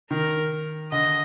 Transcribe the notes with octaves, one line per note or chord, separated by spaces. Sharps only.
D#3 A#4
D3 D#5